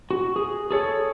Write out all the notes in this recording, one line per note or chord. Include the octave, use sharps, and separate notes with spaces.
F#4
G#4
G#4 A4 C#5